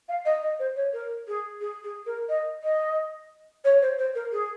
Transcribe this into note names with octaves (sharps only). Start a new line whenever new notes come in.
F5
D#5
D#5
C5
C#5
A#4
G#4
G#4
G#4
A#4
D#5
D#5
C#5
C5
C5
A#4
G#4